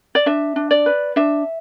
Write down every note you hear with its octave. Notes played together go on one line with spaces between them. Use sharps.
D5
D4 E5
D4
D5
B4
D4 E5